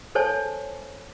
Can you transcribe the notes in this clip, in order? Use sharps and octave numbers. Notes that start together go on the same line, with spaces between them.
A4 C5 C#5 G#5 A5